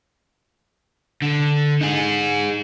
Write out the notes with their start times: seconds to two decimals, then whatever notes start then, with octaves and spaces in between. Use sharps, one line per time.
1.22 D3
1.81 D#4 G#4